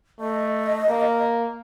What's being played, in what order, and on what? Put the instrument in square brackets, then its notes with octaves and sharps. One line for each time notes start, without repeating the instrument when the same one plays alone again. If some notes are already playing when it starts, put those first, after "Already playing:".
[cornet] A3 [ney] D#5
[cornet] A#3